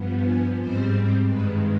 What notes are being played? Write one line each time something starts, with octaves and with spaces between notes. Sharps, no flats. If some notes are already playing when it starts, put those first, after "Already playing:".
Already playing: G2 F3 B3
G#5
G#2 G3 C4 C5
G2 D#3 G#3 B4